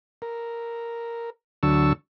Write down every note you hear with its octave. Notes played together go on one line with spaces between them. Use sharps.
A#4
D2 D3 F#3 A5 C#6 E6